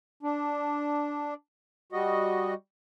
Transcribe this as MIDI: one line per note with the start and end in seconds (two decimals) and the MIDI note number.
0.23 1.34 62
1.93 2.54 55
1.93 2.54 66
1.93 2.54 75